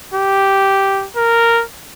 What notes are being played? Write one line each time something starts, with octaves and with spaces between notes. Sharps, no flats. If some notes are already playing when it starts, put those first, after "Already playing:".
G4
A#4